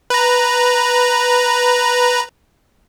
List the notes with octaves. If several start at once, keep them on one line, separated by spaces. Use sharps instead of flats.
B4 A#5